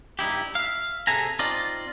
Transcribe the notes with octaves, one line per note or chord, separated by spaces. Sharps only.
G2 D#4 E4 G4
E5 F5
C3 G#4 A4 E5 G#5 A#5
C4 D#4 F4 D5 D#5